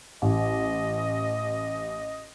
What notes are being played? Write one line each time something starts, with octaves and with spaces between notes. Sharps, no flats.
A1 D#5